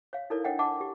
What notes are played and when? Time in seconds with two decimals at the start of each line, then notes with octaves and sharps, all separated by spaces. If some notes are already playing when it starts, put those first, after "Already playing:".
0.13 C#5 F5
0.30 D#4 E4 A4 A#4 C#5 D5
0.44 D4 C#5 D#5 F#5 G5
0.59 D#5 F#5 A5 D6
0.81 G4